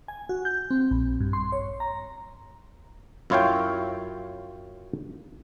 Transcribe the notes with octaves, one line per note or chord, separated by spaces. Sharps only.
G#5
F#4
G6
C4
A#1
G2
C6
C#5
A#5
F#2 E4 F4 C#5 F5 G5